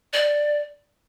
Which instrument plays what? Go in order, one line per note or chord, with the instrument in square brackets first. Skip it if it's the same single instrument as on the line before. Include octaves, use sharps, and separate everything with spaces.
[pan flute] D5